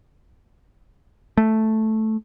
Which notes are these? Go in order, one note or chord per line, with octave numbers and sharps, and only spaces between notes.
A3